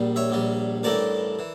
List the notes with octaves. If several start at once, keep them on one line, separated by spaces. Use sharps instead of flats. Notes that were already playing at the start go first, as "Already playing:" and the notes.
Already playing: A#1 A#2 G3
C#5 E5
A#1 A#2 G3
A1 G2 E3 A3 A#4 D5
E3